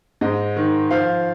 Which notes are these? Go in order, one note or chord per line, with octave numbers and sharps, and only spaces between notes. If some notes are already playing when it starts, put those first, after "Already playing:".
G#2 D#5
D#3
F3 F5